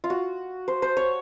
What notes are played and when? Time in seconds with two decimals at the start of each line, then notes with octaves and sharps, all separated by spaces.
0.04 F4
0.10 F#4
0.68 C5
0.82 C5
0.97 C#5